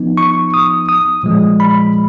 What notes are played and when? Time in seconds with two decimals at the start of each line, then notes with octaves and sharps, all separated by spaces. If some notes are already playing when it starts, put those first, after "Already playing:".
Already playing: F3 B3 D#4
0.17 C#6
0.54 D#6
0.89 D#6
1.23 A#2 F3 G#3
1.60 B5